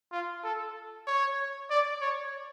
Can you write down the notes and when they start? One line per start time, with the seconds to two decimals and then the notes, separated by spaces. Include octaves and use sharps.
0.12 F4
0.43 A4
1.07 C#5
1.70 D5
2.01 C#5